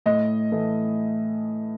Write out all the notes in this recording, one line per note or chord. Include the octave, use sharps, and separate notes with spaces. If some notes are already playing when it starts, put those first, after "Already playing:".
A2 D#5
E3 A3